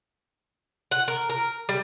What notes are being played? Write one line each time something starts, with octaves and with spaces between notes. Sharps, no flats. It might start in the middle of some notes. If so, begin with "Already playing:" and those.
F#5
A#4
A#4
G3